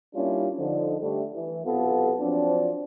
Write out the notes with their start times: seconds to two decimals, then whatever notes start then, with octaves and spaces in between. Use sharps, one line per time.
0.15 G3 A#3 C#4 D4 E4 F4
0.58 D3 F3 D#4
1.01 D3 G3 A3
1.35 E3
1.65 B1 C3 B3 F4 A4
2.20 F3 F#3 C4 D4